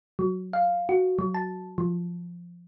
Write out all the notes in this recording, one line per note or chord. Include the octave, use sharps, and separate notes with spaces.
F#3
F5
F#4
F#3
A5
F3